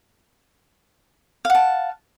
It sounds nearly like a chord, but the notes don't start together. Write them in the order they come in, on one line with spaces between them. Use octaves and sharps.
F5 F#5 A5